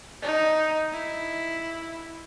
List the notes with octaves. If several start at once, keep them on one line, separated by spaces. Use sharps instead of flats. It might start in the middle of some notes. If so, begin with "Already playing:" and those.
D#4
E4